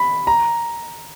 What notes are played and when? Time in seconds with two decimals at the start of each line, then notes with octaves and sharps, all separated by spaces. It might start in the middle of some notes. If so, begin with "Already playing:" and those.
Already playing: B5
0.27 A#5